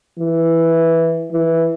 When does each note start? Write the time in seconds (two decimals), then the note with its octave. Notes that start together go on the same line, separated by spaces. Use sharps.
0.19 E3
1.32 E3